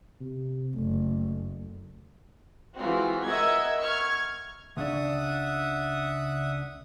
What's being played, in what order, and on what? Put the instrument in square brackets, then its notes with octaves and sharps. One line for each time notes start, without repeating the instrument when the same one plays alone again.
[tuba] C3
[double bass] F#1 [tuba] A3
[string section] E3 G#3 C4 F4 F#4
A#4 D#5 E5 F#5 E6 G#6
C#6 F6 G#6
[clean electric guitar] C#2 C#3 D4 [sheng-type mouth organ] E5 F#5 D#6